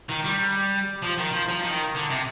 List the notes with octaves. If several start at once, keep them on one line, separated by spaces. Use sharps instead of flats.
D#3
G3
F3
D#3
F3
F3
D#3
D3
C3